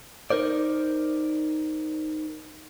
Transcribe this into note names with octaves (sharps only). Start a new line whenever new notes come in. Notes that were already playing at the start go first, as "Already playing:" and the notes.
D#4 A#4 C5 D5